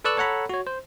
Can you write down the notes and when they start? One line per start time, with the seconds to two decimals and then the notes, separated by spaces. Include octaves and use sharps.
0.05 A4 B4 D5 C#6 E6 F#6
0.17 A4 C#5 F#5 A#5 B5
0.49 F#4 C#5
0.67 C5